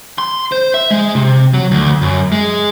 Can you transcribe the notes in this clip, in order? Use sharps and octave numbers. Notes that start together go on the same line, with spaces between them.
C6
C5
E5
G#3
C3
F#3
D2
F#2
G#3